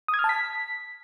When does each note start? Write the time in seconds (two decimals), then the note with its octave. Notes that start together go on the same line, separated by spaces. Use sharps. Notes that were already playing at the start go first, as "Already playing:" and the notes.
0.08 D#6
0.14 G#6
0.19 F6
0.24 A5
0.29 B6